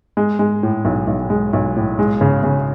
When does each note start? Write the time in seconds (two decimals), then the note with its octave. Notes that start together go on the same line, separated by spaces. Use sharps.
0.17 G#3
0.39 G#3
0.63 A2
0.85 B1
1.07 B1
1.30 G#3
1.53 B1
1.76 A2
1.99 G#3
2.21 C#3
2.44 C#3